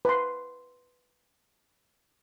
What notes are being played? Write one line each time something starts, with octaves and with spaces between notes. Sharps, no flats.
B4 C6